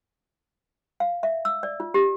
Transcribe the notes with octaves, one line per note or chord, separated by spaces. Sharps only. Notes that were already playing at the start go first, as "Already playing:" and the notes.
F5
E5
E6
D5
F4
G4